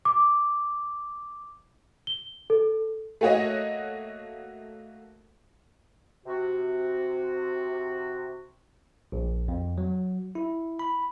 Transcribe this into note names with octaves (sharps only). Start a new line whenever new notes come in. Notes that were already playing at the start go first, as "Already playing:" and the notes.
D6
G7
A4
A3 A#3 F#4 C#5 D#5
C3 F#4
A#1
F2
F#3
E4
B5